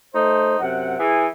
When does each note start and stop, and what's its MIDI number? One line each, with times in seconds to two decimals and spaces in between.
0.14 0.57 57
0.14 0.57 63
0.14 0.57 72
0.60 0.94 42
0.60 0.94 48
0.60 0.94 78
0.99 1.26 52
0.99 1.26 68